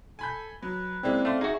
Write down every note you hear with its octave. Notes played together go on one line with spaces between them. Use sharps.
A4 G#5 B5 G6
F#3 B4
G#3 A#3 C4 C#4 E4 D5
A3 A#3 F5 C6
D#4 F#4 G#4 D#5 E5